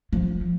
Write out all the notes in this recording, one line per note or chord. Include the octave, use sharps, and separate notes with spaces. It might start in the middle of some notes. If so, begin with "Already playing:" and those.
F3